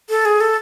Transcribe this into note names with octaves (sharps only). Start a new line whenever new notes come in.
A4
G#4
A4